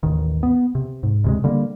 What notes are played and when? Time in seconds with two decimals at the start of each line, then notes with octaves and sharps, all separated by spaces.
0.03 A1 D#2 D#3
0.43 B3
0.75 C3
1.03 G#2
1.24 D2 C3 G#3
1.44 D3 G3 A#3